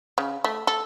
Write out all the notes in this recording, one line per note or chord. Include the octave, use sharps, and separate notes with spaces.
C#3
A3
A4